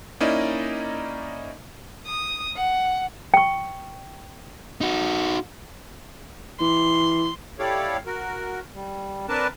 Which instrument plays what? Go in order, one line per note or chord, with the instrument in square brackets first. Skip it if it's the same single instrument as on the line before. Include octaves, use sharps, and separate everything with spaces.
[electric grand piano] A#3 C#4 D#4 E4 D5 D#5
[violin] D#6
F#5
[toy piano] G5 C#6
[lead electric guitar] D#4 F#4
[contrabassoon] E3 [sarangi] C6
[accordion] E4 G4 A4 C#5 D5 F5
F#4 A#4
G3
C4 D4 A#4 B4 A5